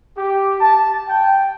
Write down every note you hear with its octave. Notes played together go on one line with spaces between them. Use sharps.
G4
A5
G5